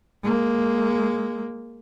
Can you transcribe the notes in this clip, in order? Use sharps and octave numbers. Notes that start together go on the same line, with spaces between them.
G#3 A#3